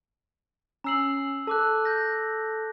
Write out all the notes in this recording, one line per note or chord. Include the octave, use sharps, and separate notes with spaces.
C#4 A#5 E6 C7 F#7
A4 A5 D6 F#6
G6 A#6